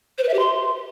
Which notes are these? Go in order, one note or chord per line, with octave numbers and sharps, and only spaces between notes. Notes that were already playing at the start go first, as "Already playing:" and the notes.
C5
B4
E5
G4
C6